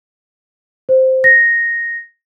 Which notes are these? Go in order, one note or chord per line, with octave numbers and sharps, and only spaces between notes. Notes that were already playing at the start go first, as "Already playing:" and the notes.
C5
A#6